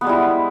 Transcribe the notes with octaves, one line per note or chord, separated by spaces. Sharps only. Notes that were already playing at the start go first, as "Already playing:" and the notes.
G3 G#3 B3 E4